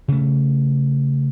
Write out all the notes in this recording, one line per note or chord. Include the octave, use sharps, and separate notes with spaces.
C#3 A3